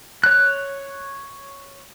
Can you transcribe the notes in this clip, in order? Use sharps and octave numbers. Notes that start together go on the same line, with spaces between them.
C#5 F#6